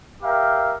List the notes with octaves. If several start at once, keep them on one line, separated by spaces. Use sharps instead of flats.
G4 A#4 E5 F5 G5